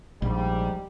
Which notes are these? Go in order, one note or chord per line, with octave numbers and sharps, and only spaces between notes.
A#1 G#2 G3